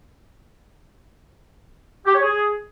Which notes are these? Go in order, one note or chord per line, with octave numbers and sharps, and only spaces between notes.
G4
C#5
G#4